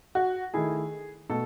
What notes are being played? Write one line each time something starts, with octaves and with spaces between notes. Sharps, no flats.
F#4
D#3 A3 E4 G#4
B2 A3 A4